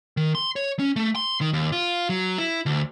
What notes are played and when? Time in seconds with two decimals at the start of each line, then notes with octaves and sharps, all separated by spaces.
0.17 D#3
0.35 C6
0.56 C#5
0.79 C#4
0.96 A3
1.16 C6
1.41 D#3
1.53 D#2
1.72 F4
2.09 F#3
2.38 E4
2.66 D2